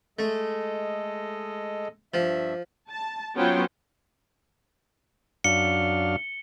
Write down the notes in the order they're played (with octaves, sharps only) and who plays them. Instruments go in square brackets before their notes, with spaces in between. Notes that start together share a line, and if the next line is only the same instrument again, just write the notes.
[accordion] G#3 A4 D#5 [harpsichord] A3
[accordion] G2 E5 [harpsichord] F3
[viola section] A5
F#3 B3 C#4 F4 C5 G5
[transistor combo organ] F#2 D4 F5 [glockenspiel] C#7 G7